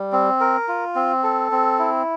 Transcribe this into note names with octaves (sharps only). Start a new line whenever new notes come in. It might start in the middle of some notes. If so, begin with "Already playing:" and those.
Already playing: G3
C4
A#4
F4
C4
A4
C4
E4